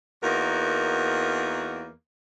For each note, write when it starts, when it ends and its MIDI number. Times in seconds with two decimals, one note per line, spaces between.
0.24 1.90 40
0.24 1.90 58
0.24 1.90 63
0.24 1.90 66
0.24 1.90 70